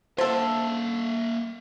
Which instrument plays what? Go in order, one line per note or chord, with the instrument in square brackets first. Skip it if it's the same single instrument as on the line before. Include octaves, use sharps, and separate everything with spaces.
[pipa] D3 A4 [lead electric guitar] A#3 E5 [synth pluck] C5